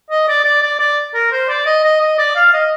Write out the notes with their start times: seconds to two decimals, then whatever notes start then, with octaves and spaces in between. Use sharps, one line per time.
0.10 D#5
0.28 D5
0.44 D5
0.62 D5
0.79 D5
1.14 A#4
1.32 C5
1.49 D5
1.66 D#5
1.84 D#5
2.01 D#5
2.18 D5
2.35 F5
2.53 D#5